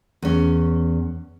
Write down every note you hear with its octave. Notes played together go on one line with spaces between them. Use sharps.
E2 C#4